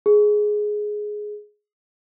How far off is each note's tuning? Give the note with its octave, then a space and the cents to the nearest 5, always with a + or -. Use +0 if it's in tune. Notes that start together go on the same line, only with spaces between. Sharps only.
G#4 +10